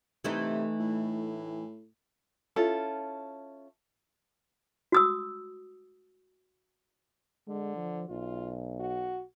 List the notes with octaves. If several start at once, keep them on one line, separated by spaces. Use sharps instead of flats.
C3 E3 A3 D#4
A2
C#4 E4 F4 A4
F#4 D#6 E6
D3 G#3
F3
B1 F4
F#4